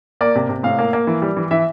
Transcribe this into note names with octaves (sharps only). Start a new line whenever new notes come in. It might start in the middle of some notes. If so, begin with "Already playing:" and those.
A#3 D5
C3
C3
A2 F5
A#3
A#3
E3
G3
E3
E3 E5